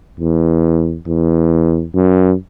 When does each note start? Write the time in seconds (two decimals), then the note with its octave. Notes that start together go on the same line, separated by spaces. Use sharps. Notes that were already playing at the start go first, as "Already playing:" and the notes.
0.20 E2
1.07 E2
1.95 F#2